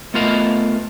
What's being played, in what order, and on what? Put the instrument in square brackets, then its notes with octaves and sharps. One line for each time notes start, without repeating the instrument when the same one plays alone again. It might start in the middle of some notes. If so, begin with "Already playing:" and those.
[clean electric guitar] A3 B3 F4 A#4 D#5 F5